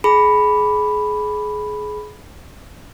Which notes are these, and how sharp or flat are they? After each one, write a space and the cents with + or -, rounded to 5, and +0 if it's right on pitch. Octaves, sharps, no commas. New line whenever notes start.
G#4 +25 B5 +0